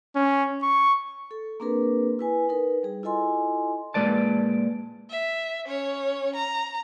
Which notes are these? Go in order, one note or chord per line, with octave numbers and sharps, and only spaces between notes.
C#4
C#6
A4
A#3 C4 D4 G#4 A#4 B4
E4 B4 G#5
D#4 A#4 B4
G3 G#4
E4 F4 A4 D#5 G#5 C6
A#2 G#3 B4 D5 A5
E5
C#4 C#5
A#5